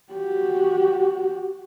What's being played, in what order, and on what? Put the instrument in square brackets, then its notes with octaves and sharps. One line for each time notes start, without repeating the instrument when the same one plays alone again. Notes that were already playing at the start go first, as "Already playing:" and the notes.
[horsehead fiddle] F#4 G4